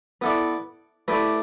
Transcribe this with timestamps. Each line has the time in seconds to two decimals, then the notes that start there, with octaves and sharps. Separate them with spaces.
0.21 B3 E4 A4 B4 D5
1.08 A3 E4 G4 B4 D5